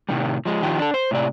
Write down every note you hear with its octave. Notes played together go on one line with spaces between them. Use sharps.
A2 C3 D#3 G3
F3 G#3
D#3 F3 G4
D4 A4
C5
A2 C3 D5